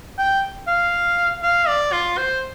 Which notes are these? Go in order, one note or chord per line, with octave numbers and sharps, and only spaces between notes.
G5
F5
F5
D5
F4
C5